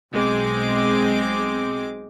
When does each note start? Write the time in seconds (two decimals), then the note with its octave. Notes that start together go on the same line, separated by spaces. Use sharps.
0.12 B1 G#3 C4 D6